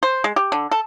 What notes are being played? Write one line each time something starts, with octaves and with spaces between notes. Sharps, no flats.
C5
G#3
G4
D3
A4